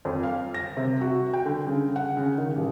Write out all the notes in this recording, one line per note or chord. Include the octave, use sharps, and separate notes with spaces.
F2
F5
A#6
C3
F#4
G5
D3
C#3
F#5
C#3
D#3
A1